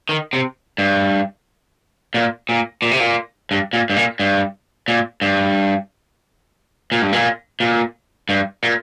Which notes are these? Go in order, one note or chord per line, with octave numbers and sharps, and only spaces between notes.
D#3
C3
G2
A#2
A#2
A#2
C3
A#2
G2
A#2
G2
A#2
G2
A#2
G2
A#2
G2
A#2
A#2
G2
A#2